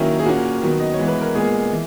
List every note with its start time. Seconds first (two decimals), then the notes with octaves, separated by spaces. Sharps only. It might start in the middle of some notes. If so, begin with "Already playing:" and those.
Already playing: D#3 F#3 A#3 C#4 E4
0.19 G#4
0.25 A#2 A#3 C#4 F#4
0.61 D#3 F#3 B3
0.80 D#5
0.94 C#5
0.99 E3 G#3 B3
1.08 B4
1.21 A#4
1.35 A#2 G#3 B3 G#4
1.71 E3